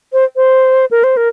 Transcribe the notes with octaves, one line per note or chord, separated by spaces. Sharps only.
C5
C5
A#4
C5
A#4